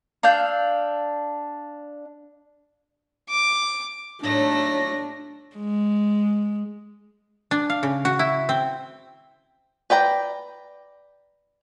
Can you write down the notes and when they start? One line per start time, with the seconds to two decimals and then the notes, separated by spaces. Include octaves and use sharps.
0.23 D4 F5 E6 G6
3.29 D6
4.23 A2 F#3 A3 D4 D#4 A#6
5.57 G#3
7.51 D4
7.70 F5
7.83 C#3
8.05 F#4
8.19 E4
8.49 C4
9.90 B4 D5 G5 A#5